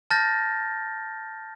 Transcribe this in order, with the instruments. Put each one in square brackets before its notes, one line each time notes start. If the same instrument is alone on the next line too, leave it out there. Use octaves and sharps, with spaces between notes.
[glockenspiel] A5 F6 G6 A6 A#6